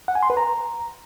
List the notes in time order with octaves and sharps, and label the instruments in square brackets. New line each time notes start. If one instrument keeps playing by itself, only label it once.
[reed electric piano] F#5
G#5
C6
B4
A#5